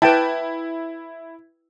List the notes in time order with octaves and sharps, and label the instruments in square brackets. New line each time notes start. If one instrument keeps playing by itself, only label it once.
[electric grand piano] E4 [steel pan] B4 G5 A5